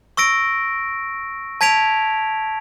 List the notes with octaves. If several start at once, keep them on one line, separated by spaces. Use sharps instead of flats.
C#6 E6 A#6 D7
A5 G#6 B6 D7 F7